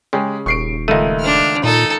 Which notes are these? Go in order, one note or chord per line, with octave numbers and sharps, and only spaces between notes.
C#3 G#3 G4 G#4
D#1 C#6 C7 D7
C#2 D#3 A3 D#4 D#7
D4 F6
A#2 D#4 A4